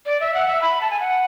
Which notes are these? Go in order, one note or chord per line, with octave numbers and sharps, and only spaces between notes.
D5
E5
F#5
E5
B5
A5
G#5
F#5